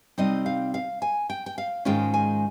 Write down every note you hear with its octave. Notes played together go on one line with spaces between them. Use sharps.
C3 G3 C4 D#4 D#5
F5
F5
G#5
G5
G5
F5
G#2 D#3 G#3 C#4 F4 G5
G#5